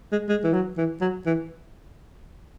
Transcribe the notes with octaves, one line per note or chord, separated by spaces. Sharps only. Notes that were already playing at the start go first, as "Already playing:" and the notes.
G#3
G#3
E3
F#3
E3
F#3
E3